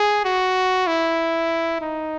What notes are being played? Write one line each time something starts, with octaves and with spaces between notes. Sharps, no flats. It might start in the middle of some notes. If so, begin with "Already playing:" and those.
Already playing: G#4
F#4
E4
D#4